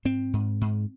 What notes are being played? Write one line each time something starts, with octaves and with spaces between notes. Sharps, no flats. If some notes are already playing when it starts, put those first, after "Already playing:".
G#2 C4
G#2
G#2